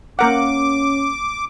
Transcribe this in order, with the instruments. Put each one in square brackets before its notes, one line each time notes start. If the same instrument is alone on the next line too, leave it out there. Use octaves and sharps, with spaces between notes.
[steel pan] A#3 A#4 F#5 [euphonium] C#4 [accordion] D6